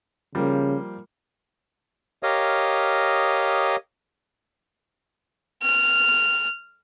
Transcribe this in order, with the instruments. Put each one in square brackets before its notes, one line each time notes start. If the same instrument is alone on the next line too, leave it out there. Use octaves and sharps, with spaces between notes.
[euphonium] C#3 [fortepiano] F3 G3 A#3
[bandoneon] G4 A#4 C#5 D#5 F5 D#6
[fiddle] F6